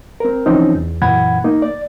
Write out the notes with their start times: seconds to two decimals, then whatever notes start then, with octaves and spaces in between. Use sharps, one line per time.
0.20 C4 A#4
0.46 E3 F3 C4 C#4 D#4
0.75 E2
1.02 F#2 A#2 E3 F#5 B5 G#6
1.44 A#3 D#4
1.62 D5